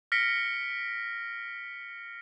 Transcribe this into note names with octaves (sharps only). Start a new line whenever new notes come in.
F6 A#6 B6 C#7 D7 G7